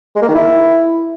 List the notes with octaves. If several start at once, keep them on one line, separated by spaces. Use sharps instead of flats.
G#3
A#3
D#3
E4